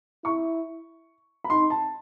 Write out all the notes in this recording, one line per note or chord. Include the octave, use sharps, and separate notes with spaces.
E4 C#6
B5
D#4 C6
A5